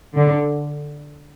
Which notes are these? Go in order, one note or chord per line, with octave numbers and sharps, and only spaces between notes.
D3